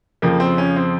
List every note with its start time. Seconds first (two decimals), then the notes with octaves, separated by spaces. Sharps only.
0.22 F2 C#3 F3 A#3
0.40 C4
0.58 C#4
0.76 C4